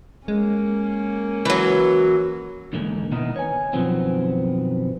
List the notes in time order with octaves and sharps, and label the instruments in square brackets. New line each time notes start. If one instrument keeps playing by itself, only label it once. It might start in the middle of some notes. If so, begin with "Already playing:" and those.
[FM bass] G#3 [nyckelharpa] A#3 C#4
[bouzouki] E3 F#3
[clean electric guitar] E2 G#2 D3 D#3 G#3 A#3
B2 D#3 E3 B3 A#4 D#5
C#5 G#5
F#2 B2 D#3 F3 B3 C4